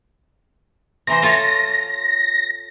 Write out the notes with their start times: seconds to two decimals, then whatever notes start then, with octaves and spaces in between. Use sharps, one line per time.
1.07 C3 E3 C5 A#6
1.22 F4 A4 C#5